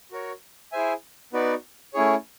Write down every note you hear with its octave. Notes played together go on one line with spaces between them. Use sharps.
F#4 A#4 C#5
E4 G#4 C5 E5 G#5
B3 D#4 F#4 B4 D5
A3 C#4 E4 G#4 C#5